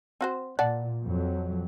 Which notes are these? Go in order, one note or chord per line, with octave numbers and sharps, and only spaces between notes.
C4 F#4 C5
A#2 D5 F#5 A5
F2 F#3